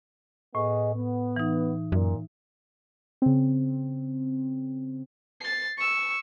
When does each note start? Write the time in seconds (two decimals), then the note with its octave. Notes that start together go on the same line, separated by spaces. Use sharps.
0.55 A2 B3 G#4 D#5
0.95 B3
1.36 E3 D#4
1.92 F#2 A#2
3.22 C#3 C4
5.41 A6 C7
5.77 C#6 E6